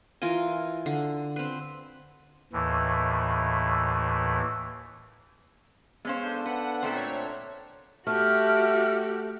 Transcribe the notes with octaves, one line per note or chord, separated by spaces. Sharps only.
E3 F4 A#4 G#5
D3
C4 B4
D#2 A2 E3
G#3 B3 C#4 C5 F5
D4 A4 G6
B4 F#5
A#2 A3 C4
C#5
A3 F#4 G4 F6